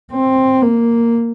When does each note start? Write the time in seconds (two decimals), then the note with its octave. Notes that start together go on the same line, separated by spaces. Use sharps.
0.12 C4
0.62 A#3